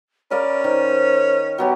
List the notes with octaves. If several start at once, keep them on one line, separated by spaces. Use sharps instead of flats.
C#4 A#4 D5 F5 B5
D#3 C5
F#3 B3 G4 C#5